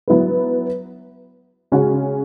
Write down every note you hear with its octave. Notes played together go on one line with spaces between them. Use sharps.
F#3 B3 E4 B4
C#3 G#3 C#4 F#4